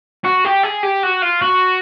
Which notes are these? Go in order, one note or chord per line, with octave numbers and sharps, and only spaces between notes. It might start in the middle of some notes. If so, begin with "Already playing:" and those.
F#4
G4
G#4
G4
F#4
F4
F#4